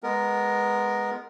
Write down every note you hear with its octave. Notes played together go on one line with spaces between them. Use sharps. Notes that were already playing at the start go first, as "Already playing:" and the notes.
G#3 B3 A#4